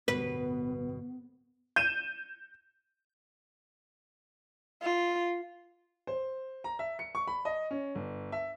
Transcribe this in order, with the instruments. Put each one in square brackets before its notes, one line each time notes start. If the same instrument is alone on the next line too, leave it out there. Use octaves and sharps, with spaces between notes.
[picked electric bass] D1 G1 B2 [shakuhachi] B3 [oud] B4
[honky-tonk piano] G6 D#7 E7
[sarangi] F4
[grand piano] C5
A#5
E5
C#7
C#6
B5
D#5
C#4
G1
E5